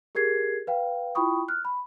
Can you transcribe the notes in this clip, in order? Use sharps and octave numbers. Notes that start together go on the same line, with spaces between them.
G4 G#4 A#4 G#6 C7
B4 F5 G5
E4 F4 G5 B5 C#6 D#6
F6 F#6
B5